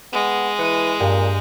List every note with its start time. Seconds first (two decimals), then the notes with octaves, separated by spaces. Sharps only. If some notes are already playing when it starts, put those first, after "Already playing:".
0.13 G#3 B3
0.59 E3 F#6 C#7
1.00 G2 A#2 G5